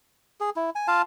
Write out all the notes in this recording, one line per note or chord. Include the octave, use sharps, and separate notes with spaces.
G#4
E4
G#5
F4 F5 A5